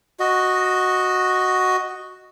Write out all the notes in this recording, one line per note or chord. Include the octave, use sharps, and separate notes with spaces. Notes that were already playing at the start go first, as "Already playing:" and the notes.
F#4 D#5